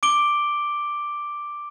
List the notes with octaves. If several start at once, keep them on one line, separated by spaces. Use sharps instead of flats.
D6 D7 G7